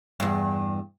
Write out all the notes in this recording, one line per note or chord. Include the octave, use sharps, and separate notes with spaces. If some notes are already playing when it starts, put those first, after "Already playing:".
E2 G2